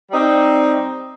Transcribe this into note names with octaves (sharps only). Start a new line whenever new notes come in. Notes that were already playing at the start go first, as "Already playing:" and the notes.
G3 C4 D#4